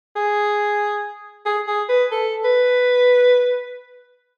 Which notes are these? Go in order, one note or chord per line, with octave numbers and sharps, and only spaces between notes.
G#4
G#4
G#4
B4
A4
B4